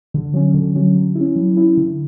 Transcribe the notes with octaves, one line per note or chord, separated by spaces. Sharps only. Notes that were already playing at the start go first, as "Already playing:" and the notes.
D3
F#3 C#4
D3
F#3 C#4
F#3
C#4 E4
F#3
C#4 E4
D3